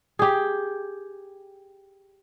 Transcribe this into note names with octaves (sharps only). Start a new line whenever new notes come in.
G4 G#4